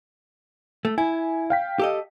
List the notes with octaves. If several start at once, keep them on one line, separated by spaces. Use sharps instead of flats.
A3
E4 G#5
F5 G5 B6
G4 A4 D#5